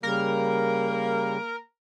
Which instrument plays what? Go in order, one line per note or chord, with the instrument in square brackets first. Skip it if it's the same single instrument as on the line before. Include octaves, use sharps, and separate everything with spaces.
[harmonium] C#3 G3 [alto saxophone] A#3 [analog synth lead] A#4